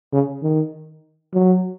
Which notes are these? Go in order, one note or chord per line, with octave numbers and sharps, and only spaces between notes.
C#3
D#3
F#3